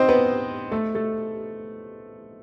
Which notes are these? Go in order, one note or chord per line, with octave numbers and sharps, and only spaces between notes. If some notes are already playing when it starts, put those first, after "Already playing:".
Already playing: C4 D#4 C5 D#5
B3 B4
A3 A4
A3 A4